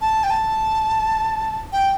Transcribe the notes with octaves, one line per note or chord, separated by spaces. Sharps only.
A5
G5
A5
G5